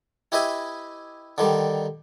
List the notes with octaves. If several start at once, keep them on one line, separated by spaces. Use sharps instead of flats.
E4 G4 B4 D#5 E5 G#5
D3 D#3 G3